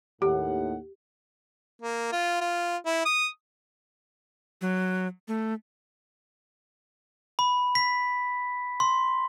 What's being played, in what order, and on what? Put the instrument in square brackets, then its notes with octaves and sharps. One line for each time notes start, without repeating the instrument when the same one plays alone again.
[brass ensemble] D#2 A2 F#5 [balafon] G4
[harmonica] A#3
F4
F4
E4
D#6
[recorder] F#3
A3
[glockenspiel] B5
B6
C6